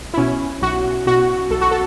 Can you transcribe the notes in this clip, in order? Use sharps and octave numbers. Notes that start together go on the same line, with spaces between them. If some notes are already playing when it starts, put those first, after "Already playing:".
Already playing: B1
E4
B2 C#4
B1 F#4
B2 F#4
B1 A4
F#4
A4